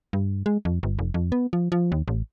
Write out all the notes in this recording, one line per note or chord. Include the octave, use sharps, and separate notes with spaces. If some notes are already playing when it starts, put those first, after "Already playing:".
G2
G#3
F2
G1
F1
F2
B3
F3
F3
D#2
A1